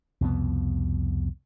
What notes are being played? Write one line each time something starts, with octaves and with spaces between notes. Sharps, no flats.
C2 F2 B2 B3